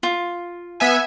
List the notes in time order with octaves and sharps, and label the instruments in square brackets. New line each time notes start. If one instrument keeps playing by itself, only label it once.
[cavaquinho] F4
[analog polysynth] B3 E5 G#5